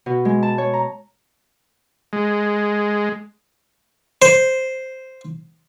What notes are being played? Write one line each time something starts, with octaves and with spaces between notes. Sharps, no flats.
B2
G#3
A5
C#5
A#5
G#3
C5